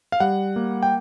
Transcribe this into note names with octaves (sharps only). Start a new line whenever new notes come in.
F5
G3 F#5
A#3
G5